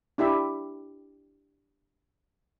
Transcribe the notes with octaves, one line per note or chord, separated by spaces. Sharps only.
D4 E4 G4 E5